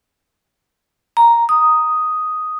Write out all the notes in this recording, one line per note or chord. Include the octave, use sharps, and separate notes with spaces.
A#5
D#6